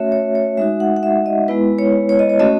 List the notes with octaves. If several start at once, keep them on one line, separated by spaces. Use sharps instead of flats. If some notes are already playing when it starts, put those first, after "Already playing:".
Already playing: A3 C#4 F#4 C#5 E5
C#5
C#5
G#3 D#4 F#4 E5
F#5
F#5
E5
D#5
G#3 B3 E4 B4
C#5
C#5
D#5
C#5
A3 C#4 F#4 D#5